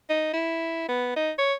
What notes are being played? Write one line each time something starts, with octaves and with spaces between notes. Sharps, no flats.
D#4
E4
B3
D#4
C#5